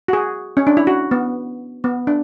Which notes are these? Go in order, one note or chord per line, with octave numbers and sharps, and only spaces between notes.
F#4
G#4
C#4
D4
E4
F#4
B3
B3
D4